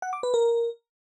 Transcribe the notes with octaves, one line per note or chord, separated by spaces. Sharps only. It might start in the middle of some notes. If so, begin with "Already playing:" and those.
F#5
D6
B4
A#4